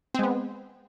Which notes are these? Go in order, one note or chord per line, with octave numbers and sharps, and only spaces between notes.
G#3 B3 C4